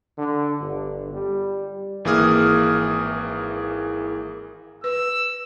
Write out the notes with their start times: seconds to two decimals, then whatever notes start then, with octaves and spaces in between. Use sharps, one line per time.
0.18 D3
0.60 G1
1.13 G3
2.05 G#1 E3 A#3 G#4 D#6 F6
4.84 B4 E6